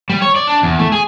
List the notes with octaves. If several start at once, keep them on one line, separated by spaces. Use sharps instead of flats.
G3
C#5
D5
D4
E2
A3
G#4